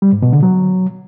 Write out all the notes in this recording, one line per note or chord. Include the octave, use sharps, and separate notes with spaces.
G3
G#2
B2
D3
F#3